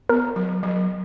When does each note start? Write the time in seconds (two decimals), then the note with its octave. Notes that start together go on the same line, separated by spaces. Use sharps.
0.09 B3 A#4
0.36 F#3
0.63 F#3